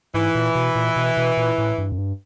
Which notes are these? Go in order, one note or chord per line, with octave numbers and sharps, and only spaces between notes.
G#2 E3
A#2
B2
A#2
B2
B2
A#2
A2
G2
F#2
G2